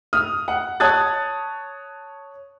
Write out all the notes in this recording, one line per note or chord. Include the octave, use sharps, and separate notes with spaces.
D#6 F6
F#5
C#5 A5 D#6 F#6 G#6 A6